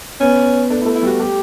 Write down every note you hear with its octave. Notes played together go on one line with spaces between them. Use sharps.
B3 C#4
A3 D4
A3 E4
E4
G3 F#4
A3 G4